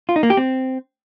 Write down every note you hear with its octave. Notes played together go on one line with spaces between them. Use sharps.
F4
D#4
A#3
G4
C4